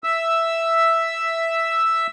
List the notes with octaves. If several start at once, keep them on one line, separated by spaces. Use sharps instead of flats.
E5 E6